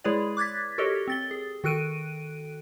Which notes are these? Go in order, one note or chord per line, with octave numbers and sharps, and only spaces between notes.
G#3 E4 G#4 B4 C#5 D5
D6 F#6 G#6 A6 B6
F#4 G4 A4 A#4 C#5 D#5
C4 A6 G7
G#4
D#3 F#4 A4 F#6 D7 D#7